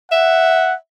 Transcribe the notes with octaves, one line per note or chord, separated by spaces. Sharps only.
E5 F#5